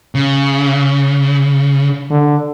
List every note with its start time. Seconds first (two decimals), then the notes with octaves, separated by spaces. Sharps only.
0.15 C#3
2.10 D3